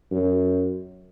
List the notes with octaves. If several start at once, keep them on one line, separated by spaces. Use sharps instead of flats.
F#2